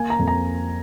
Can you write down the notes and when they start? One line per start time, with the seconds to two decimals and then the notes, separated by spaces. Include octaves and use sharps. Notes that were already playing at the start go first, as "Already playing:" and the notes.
Already playing: A#3 G#5
0.10 A#5
0.19 F2
0.28 A#5